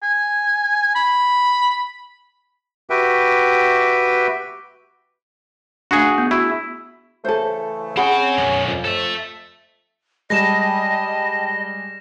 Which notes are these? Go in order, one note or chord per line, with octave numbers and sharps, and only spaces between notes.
G#5
B5
F#4 G4 B4 E5 G5
A3 D4 F#4 G#4
B3
E4 F#4 G#4
C#3 E3 A3 A4 C5
C4 C#4 G#4 F#5 G5 B5
B1 F#2
F2
A4 E5
G3 G#3 D#5 G5 A5 B5 A#6 E7